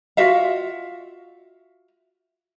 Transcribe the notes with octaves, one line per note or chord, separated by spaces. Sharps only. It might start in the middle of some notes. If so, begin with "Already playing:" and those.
F4 F#4 E5 F5